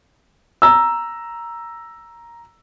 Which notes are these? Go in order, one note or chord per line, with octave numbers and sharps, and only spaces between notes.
A#5 E6